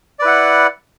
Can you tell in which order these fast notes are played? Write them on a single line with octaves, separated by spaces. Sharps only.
D5 B4 E4 F#5